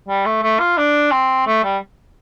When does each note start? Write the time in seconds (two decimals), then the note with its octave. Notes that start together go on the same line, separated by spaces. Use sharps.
0.08 G3
0.26 A3
0.43 A3
0.60 F4
0.77 D4
1.12 C4
1.47 A3
1.64 G3